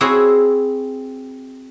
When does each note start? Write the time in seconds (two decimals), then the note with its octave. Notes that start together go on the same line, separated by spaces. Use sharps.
0.01 C4 E4 F#4 G#4 C#5